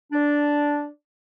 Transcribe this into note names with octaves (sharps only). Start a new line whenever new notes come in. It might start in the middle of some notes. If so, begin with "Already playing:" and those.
D4